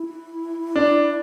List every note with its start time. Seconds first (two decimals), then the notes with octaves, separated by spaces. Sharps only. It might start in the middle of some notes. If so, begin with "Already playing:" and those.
Already playing: E4
0.76 D4